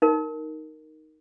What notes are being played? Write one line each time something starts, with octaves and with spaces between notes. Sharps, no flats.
D#4 A#4